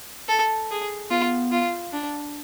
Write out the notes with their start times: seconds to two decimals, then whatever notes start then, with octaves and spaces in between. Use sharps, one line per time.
0.28 A4
0.70 G#4
1.10 B3 F4
1.52 F4
1.93 D4